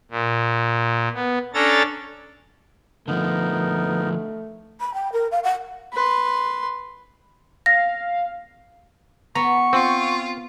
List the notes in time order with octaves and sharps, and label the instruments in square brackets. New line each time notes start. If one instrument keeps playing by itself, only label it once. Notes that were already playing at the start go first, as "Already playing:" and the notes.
[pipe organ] A#2
B3
C#4 D4 A4 A#5 A6
[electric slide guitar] D3 F3 [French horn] A3 [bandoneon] B3 D#4 A#4
[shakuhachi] B5
G5
A#4
F5
F#5
[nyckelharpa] B4 C6
[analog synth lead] F5 [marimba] A#6
[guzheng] B3 [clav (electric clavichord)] A#5 [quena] C#6
[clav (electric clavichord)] C4 [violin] F4